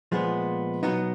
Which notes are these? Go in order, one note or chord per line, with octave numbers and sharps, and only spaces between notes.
A#2 F3 G#3 B3
B2 F#3 B3 D#4